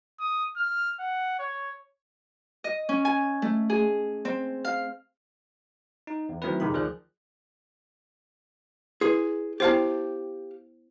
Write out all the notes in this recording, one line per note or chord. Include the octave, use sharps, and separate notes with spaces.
D#6
F6
F#5
C#5
D#5
C#4
G#5
A3
G#4
C4
F5
D#4
E2
D#3 F#3 A3 C4 E4 B4
G1 F2 C3 D#3 G#4 B5
D2 D#3 F3 G#4 D5 F#6
E4 G#4 B4
B3 E4 G4 C5 F5 A5